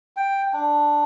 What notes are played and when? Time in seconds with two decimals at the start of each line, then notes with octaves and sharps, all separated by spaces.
0.17 G5
0.53 D4